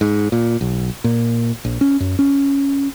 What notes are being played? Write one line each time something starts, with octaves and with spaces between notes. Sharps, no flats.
G#2
A#2
B1
A#2
A#1
C#4
F#2
C#4